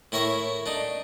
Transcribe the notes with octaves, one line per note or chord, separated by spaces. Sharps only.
A2 E4 A#4 C#5 E5 A#5
D4 D#4